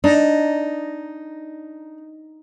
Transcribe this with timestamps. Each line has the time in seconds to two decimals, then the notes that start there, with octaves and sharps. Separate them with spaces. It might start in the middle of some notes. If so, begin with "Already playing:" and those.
0.04 D4 D#4